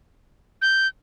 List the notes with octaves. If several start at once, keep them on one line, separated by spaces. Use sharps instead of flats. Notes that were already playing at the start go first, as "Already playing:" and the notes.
G6